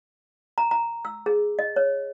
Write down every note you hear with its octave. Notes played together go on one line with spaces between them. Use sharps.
A#5
A#5
E6
G#4
D#5
C#5